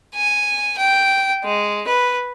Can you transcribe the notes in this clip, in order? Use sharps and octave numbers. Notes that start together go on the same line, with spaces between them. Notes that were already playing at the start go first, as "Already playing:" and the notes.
G#5
G5
G#3
B4